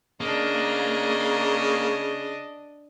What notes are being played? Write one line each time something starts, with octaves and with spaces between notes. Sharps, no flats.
C#3 A#3 D4 D#5